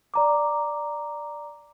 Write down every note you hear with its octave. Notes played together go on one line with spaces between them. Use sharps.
D5 A#5 D6